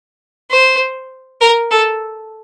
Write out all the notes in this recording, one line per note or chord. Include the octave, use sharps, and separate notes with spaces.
C5
A#4
A4